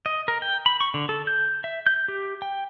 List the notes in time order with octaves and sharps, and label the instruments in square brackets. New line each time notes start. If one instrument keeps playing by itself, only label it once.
[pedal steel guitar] D#5
A#4
G5
B5
C#6
D3
A4
G6
E5
G6
G4
G5